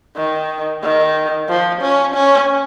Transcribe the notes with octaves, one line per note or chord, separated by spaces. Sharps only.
D#3
D#3
F3
C#4
C#4